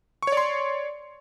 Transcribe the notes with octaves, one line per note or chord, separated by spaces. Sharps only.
C#5 D5 C6 C#6